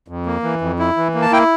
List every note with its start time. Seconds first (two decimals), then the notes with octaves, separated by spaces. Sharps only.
0.08 F2
0.26 A#3
0.43 E3
0.61 F2
0.79 E4
0.97 E3
1.15 A#3
1.22 A5
1.32 E4 G5